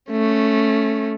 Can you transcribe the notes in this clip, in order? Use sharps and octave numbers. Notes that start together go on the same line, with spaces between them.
A3 C#4